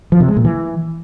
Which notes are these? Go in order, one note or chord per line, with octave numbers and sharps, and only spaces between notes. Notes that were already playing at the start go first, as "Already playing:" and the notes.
F3
C3
G#3
A#2
E3